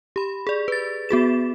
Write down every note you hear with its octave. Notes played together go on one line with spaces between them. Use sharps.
G4 B5
G#4 D5
B4 A6
B3 F#4 G#4 E7